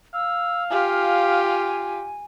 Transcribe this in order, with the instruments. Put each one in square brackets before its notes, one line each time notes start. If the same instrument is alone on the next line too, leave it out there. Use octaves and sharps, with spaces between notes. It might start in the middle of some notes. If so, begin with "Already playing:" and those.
[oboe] F5 [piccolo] E6
[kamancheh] F4 G4 [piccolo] G#5